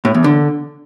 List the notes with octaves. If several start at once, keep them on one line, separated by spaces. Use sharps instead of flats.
A2
E2
D3